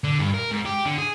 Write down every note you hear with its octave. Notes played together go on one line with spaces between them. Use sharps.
D3
G2
A#4
G#2
G4
D3
G#4